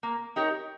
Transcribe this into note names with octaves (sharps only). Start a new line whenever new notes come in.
A#3
D#4 G4 A#4 C#5